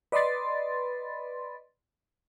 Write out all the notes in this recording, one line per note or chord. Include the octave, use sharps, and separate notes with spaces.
B4 D5 D#5 B5 C6 A6